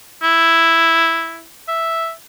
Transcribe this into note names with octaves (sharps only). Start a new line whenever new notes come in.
E4
E5